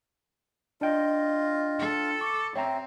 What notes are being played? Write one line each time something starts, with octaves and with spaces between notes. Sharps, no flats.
D4 F4 D#5 G5
A4
C#6 D6
C4 C#5 E5 G5 A#5